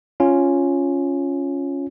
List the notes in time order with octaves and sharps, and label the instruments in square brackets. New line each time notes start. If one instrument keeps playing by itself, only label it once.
[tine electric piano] C#4 F4